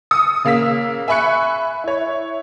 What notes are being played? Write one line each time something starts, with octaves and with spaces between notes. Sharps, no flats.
D#6 C#7
C#3 A#3 F5 E6 B6
E5 G#5 B5 C#6 F#6 C#7
E4 C#5